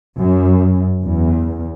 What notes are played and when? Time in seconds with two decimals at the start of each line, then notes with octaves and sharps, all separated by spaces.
0.18 F#2
1.04 E2